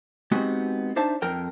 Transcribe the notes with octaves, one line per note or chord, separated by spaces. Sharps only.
G#3 B3 C4 D#4 F#4 G4
D4 D#4 C5 E5 A5
F2 A#4 G5